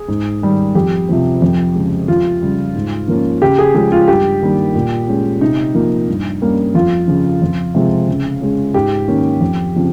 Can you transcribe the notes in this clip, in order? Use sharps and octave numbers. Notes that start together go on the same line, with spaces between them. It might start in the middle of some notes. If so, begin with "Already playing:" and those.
Already playing: G#4
G#2
D#3 G3
F2 G4
C3 F3 C4
F2
C#3 G#3
F2 F4
C#3 G3
G#2
F3 A#3 C#4
C#3 G4
G#4
F3 G#3 C#4 G#4
F4
G2 G4
D#3 G3 A#3
A#2
G#3 C#4
C3 D#4
F3 A#3
G2
G3 A#3 C#4
F2 F4
C#3 F3
F2
C3 F3 G#3 C4
C#3
G#3 C#4
G#2 G4
D#3 A#3 C#4
F2
C#3 F3 C4